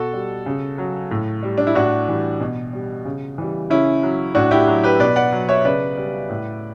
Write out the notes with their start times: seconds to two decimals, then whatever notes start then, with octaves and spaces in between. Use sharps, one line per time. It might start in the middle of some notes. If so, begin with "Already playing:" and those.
Already playing: B2 F#4 A4
0.13 G3
0.46 C#3
0.78 F#3
1.11 A2
1.43 G3
1.58 D4
1.67 E4
1.75 A2 D4 F#4
2.08 E3 G3
2.41 B2
2.73 G3
3.05 C#3
3.38 E3 G3
3.70 C#3 C#4 E4
4.03 F#3
4.35 A2 D4 F#4
4.51 E4 G4
4.67 F#3
4.83 G4 B4
5.00 B2 B4 D5
5.16 D5 F#5
5.33 F#3
5.49 C#5 E5
5.65 C#3 B4 D5
5.97 G3
6.30 A2